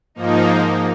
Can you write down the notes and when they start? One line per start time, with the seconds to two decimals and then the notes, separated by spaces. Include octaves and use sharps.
0.15 G#2 F3 A#3 D#4